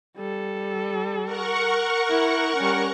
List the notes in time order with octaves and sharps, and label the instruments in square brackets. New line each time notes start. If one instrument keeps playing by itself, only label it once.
[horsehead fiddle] G3 A4
[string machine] A#4 F#5 C#6
[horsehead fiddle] E4
G3 C#4